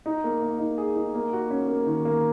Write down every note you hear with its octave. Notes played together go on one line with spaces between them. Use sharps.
D#4
A#3
A#3
D#4
G#4
D#4
A#3
F#4
C#4
A#3
D#3
A#3